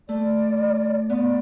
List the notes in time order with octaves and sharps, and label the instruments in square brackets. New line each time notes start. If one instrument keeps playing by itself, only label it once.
[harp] A3 [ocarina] D5
[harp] B3 [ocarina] D5